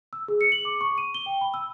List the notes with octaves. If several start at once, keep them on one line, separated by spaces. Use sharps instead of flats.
E6
G#4
C#7
F#7
D6
C#6
D#7
G7
G5
B5
E6